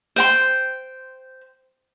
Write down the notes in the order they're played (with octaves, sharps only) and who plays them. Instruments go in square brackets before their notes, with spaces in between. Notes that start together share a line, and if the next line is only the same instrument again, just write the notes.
[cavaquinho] C5 G5 C6